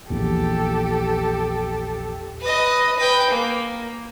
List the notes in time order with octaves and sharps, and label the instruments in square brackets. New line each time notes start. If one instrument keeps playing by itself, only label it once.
[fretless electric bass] A#1 E2 [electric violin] G4 A4
[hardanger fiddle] B4 D#5
B4 G5
A#3